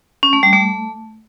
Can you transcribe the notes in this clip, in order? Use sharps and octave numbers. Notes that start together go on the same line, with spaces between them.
C#4
A3
G3
A3